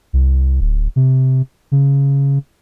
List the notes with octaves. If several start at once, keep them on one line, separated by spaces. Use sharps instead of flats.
C2
D1
C3
C#3